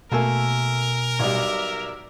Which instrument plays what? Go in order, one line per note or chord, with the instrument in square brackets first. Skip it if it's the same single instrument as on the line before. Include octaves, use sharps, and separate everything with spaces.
[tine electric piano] B2 G#5 [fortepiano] A3 A#3 A4 [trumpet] A#4 [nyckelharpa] E5
[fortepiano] B1 G3 [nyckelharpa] D5 E5